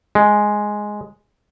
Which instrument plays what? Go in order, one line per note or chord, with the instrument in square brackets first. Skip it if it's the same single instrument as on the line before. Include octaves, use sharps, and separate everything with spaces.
[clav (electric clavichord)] G#3